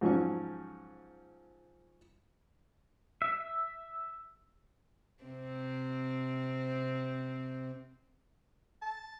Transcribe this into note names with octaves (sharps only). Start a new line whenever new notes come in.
G#2 F3 F#3 C#4 C#6
E5
C3 C4
A5